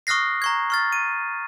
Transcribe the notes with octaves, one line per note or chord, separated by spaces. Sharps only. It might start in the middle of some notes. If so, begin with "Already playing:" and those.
C#6 D#6 F6 F#6 A#6 C7
A#5 C#6 G#6
C#6 F6 A6
D#7